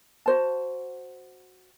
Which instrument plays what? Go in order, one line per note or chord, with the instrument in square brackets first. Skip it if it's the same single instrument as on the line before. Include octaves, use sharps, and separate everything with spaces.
[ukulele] F#4 C5 A5